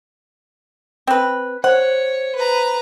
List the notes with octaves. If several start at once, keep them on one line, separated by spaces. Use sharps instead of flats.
C4 B4
C5 C#5 F#5
B4 A#5